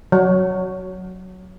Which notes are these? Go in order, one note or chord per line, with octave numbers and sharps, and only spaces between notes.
F#3